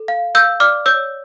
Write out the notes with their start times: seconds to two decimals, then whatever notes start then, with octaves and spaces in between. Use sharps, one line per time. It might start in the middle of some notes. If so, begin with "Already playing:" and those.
Already playing: A4
0.08 F5
0.35 F5 E6 G6
0.60 D5 D6 F6
0.86 C#5 E6 G6